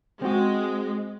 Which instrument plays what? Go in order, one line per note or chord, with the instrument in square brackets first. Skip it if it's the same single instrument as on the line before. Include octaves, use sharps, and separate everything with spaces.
[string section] G#3 [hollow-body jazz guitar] C4 F#4